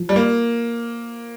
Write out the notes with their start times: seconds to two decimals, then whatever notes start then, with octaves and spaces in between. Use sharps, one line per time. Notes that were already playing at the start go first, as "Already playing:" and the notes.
Already playing: F3
0.09 G3
0.16 A#3